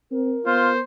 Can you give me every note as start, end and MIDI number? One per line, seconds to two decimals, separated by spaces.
0.11 0.37 60
0.11 0.76 70
0.46 0.80 59
0.46 0.70 65
0.46 0.83 72